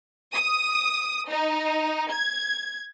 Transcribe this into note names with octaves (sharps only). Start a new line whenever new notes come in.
D#6
D#4
G#6